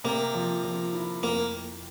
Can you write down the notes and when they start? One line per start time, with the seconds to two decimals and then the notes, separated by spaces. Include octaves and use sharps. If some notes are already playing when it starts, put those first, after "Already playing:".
0.04 C3 A#3
0.34 F3
0.64 F3
0.93 E4
1.23 F2 A#3